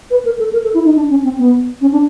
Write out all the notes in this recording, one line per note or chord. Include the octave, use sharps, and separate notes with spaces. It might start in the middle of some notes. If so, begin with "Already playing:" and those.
B4
A#4
A4
A#4
A4
E4
D#4
D4
C#4
C4
B3
C#4
D4